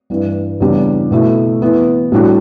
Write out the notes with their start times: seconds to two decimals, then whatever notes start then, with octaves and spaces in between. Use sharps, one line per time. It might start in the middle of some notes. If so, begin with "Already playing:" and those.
0.10 G2 E3 G3
0.60 E2 C#3 G3 D4 G4
1.11 B2 A3 E4
1.62 E3 B3 E4
2.12 A2 G3 D4 F#4